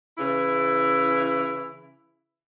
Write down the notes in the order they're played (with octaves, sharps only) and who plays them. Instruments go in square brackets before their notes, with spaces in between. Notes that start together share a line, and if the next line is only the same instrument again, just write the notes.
[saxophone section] C#3 E3 E4